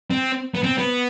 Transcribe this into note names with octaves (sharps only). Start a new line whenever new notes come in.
C4
B3
C4
B3